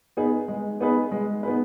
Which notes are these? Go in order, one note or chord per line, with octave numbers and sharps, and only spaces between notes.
B3 D#4 G#4 B4
G#3
B3 D#4 G#4 B4
G#3
B3 D#4 G#4 B4